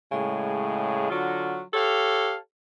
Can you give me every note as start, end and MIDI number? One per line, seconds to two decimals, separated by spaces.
0.12 1.09 45
0.12 1.09 49
0.12 1.09 56
1.10 1.62 50
1.10 1.62 54
1.10 1.62 65
1.10 1.62 66
1.74 2.37 67
1.74 2.37 69
1.74 2.37 73
1.74 2.37 77